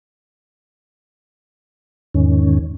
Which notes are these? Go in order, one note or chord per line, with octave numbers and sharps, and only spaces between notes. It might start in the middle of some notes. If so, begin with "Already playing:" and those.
E2 G#2 D#3 C#4